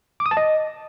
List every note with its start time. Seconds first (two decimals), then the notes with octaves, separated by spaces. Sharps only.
0.20 D6
0.26 D#6
0.31 A5
0.37 D#5